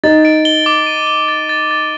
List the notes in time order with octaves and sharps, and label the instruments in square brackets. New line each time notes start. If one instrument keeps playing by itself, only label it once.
[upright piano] D#4 [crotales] A6
[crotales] D7
G7
D6
D#7
G7
A6
A6
A6